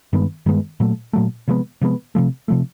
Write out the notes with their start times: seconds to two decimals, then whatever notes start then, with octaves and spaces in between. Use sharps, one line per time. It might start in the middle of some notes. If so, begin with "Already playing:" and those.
0.13 G2 D#3 G#3 B3
0.46 G2 D#3 G#3 B3
0.80 A#2 F#3 A3
1.13 A#2 F#3 A3
1.48 C3 F3 G#3 B3
1.81 C3 F3 G#3 B3
2.15 C3 F3 A3
2.48 C3 F3 A3